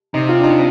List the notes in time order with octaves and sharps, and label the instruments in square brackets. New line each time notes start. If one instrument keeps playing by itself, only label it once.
[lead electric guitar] C3 [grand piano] D#4
[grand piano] F4
D4
D#4